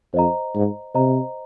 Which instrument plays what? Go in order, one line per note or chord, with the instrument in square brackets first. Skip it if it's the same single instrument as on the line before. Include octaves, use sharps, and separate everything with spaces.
[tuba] F2 [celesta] C5 D#5 A#5
[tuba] G#2
[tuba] C3 [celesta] C5 D#5 A#5